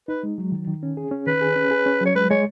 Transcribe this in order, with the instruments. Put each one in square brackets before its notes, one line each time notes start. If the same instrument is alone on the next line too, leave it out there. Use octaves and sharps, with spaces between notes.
[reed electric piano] D#4 [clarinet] B4
[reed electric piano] G#3
F#3
D#3
D#3
C#4
G#4
C#4
[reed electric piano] D#3 [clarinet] B4
[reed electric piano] G#4
C#4
G#4
C#4
[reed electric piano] F#3 [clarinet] C#5
[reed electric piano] G#3 [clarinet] B4
[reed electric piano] G#3 [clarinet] C#5